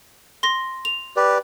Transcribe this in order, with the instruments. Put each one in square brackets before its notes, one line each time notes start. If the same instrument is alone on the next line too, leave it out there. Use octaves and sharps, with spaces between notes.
[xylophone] C6 A#6
F7
[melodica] G4 B4 D5